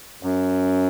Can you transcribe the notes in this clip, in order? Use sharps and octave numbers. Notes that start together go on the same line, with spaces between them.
F#2